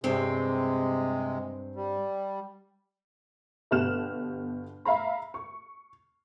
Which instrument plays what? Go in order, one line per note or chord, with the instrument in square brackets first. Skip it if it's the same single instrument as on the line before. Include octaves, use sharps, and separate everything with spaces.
[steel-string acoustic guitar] G2 C4 [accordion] C3 G#3
[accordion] G3
[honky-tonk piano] G1 B2 G4 F6 F#6 E7
E5 F5 A#5 B5
C#6